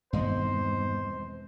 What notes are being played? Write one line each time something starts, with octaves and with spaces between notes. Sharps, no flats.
E1 G2 D#3 B3 C4 C5 D#5